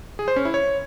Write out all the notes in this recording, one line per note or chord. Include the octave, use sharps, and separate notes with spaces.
G#4
C5
C#4
E4
C#5